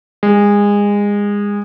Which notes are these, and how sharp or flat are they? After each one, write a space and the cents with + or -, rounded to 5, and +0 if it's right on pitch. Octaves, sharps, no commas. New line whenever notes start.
G#3 -25